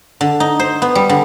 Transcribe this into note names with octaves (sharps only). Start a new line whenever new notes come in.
D3
D#4
C5
B3
G3
D3